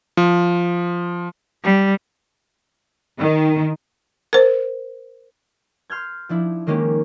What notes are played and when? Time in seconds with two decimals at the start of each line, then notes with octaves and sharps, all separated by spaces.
0.17 F3
1.64 G3
3.19 D#3
4.33 A#4 C5
5.90 C6 F6 G6 G#6
6.29 F3 D4 E4
6.67 D#3 G#3 A#3 C#4 G4